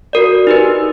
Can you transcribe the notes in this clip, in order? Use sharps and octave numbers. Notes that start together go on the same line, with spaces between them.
F#4 A#4 D5
D#4 G4 B4